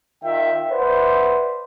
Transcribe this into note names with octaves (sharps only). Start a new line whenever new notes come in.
D#3 F4 E5 G5
B4 C5 D5 E5 F#5